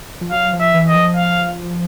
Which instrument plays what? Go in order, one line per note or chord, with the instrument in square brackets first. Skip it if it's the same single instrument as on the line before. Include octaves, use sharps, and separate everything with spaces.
[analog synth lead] F3
[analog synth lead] F#3 [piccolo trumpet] F5
[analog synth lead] F3
[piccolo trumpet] E5
[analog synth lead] E3
[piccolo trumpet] D#5
[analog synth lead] F3
[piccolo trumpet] F5